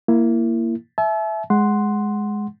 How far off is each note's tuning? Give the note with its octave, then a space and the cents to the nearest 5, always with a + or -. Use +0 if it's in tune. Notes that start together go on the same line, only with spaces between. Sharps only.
A#3 +0 E4 +20
E5 +0 A5 -45
G#3 +0 F#5 +0 C6 +0